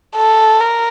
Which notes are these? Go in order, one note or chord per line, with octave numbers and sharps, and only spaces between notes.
A4
A#4